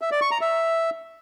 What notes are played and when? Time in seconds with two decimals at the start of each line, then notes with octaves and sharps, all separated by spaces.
0.01 E5
0.11 D5
0.21 C#6
0.31 A#5
0.41 E5